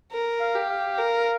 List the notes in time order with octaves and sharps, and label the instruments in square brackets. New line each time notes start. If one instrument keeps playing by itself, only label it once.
[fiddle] A#4
[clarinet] F5
[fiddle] G4
[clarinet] F5
[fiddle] A#4